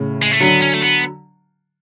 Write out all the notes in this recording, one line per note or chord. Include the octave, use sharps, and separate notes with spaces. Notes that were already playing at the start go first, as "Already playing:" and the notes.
Already playing: A2 C#3
G#3
A3
D3 F#3 B3
C#4
A3
B3